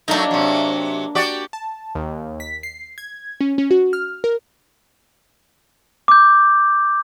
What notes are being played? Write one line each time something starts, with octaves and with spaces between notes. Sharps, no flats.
F#3 A3 A#3 D4 D#4
C3 F#3
F#4 G4 D5
A5
D#2
B6
C7
G#6
C#4
C#4
F#4
F6
A#4
D6 G6